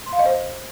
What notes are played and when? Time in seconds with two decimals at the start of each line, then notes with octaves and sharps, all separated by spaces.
0.06 C6
0.13 F5
0.19 D#5
0.26 C5